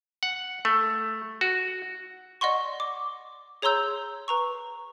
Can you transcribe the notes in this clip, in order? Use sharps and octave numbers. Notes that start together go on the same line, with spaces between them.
F#5
A3
F#4
D5 D#5 F#5 C6 C#6
D6
G#4 C#5 A#5 C6 E6 G6
B4 A#5 C#6